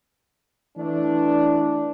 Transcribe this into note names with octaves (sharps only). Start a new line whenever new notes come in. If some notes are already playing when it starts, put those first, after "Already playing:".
E3 A3 D4